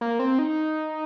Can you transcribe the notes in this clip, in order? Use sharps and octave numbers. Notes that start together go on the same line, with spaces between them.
A#3
C4
D#4